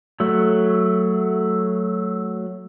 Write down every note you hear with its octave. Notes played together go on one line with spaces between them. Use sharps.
F#3 A3